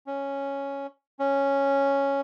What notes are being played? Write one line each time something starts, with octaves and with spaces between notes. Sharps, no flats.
C#4
C#4